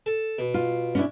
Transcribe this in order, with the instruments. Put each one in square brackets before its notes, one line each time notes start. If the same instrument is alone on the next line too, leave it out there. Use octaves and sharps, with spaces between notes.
[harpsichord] A4
B2
[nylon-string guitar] F4
C#4 D4 E4